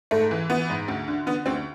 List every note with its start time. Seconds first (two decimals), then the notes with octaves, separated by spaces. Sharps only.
0.11 G#2 A3
0.31 E3
0.49 E3 B3
0.70 G#2
0.88 D2
1.08 D3
1.26 D3 B3
1.46 D2 C4